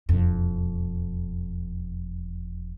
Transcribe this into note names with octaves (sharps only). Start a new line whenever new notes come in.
E1 F2